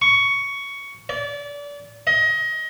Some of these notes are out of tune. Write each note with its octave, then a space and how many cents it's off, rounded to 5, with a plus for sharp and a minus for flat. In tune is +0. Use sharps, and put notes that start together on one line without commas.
C#6 +10
D5 -30
D#5 +25